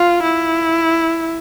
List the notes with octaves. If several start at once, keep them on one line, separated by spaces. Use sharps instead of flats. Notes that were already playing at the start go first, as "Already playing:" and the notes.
Already playing: F4
E4